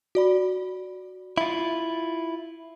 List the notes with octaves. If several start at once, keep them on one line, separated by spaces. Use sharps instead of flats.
F#4 D5 B5
E4 F4